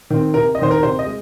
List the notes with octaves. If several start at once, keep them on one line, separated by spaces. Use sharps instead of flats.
D#3 C4
C3 A#4
D#5
D#3 C4 C5
A#4
C3 C5
D#5
G#3